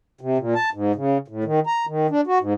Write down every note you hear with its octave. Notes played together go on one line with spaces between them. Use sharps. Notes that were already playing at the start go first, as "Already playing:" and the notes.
C3
A#2
A5
G#2
C#3
A2
D#3
A#5
D#3
D4
F#4
G#2